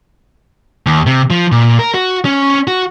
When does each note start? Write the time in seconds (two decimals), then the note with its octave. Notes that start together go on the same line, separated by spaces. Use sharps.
0.86 D#2
1.06 C3
1.30 F3
1.52 A#2
1.79 A#4
1.94 F#4
2.25 C#4
2.67 F#4